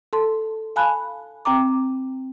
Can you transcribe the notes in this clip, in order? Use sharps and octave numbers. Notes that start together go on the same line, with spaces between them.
A4 A5 C6
F5 G#5 A5 B5 F#6
C4 G5 A#5 D6